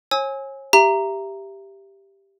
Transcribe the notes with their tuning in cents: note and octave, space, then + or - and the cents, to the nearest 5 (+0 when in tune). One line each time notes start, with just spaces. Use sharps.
C#5 -35 G#5 +0 E6 -30
G4 +0 E5 +25 A#5 +0